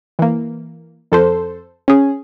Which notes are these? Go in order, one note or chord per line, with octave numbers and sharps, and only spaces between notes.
E3 A#3
F2 A4 C5
C#4 G#4